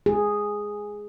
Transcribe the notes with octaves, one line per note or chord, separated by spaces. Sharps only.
G#4